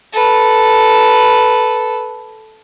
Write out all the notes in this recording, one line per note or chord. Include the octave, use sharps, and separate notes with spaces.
A4 B4